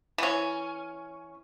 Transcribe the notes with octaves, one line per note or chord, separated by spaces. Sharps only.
E3 C#4